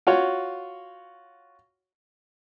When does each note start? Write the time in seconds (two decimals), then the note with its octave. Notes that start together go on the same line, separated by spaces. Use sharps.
0.07 F4 F#4 C#5